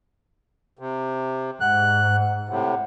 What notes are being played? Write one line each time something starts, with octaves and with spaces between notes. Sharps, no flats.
C3
G#2 F#5 F#6
A2 C3 F#5